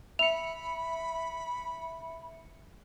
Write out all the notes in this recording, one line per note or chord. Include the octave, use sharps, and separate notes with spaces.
E5 B5 C#7 F7